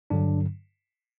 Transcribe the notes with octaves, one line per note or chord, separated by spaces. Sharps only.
G2 D3 F#3 D4